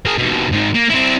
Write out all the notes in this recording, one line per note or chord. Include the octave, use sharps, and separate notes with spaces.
G#4 A#4
D#2 B2
G#2 D#3
A#3
C4 E4